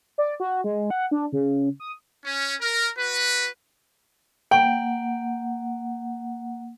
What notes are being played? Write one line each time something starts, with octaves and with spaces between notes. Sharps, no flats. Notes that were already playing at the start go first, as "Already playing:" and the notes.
D5
F#4
G#3
F#5
D4
C#3
D#6
C#4
A#4
F#4 B4
A#3 F#5 G5